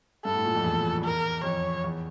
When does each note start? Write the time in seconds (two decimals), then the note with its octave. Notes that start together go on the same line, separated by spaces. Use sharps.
0.25 G2 A4
0.35 A2
0.44 A#2
0.55 F2
0.64 E2
1.04 A#4
1.44 F2 C#5
1.84 E2